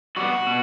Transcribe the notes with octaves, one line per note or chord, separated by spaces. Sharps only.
G3 B3 F#4
B2